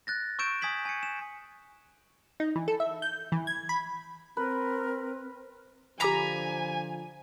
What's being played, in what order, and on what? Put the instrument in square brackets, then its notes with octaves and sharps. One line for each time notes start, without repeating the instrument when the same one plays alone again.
[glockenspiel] F#6 A6 A#6
C#6 E6 F#6 G6 D7 E7
G#5 D#6 G#6 B6 F#7
G#5 C#7
E7
[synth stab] D#4
E3
A4
E5
G6
E3
G#6
B5
[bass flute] C4 [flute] A#4 [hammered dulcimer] B4
[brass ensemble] D3 F3 [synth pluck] G4 D6 B6 [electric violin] G#5 [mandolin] A#5 B5